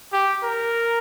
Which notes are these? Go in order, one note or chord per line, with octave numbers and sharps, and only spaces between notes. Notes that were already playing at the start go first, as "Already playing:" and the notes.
G4
A#4